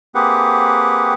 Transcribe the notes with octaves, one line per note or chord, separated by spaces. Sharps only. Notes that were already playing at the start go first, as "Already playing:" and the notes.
A#3 C4 G4 G#4 B4 F#5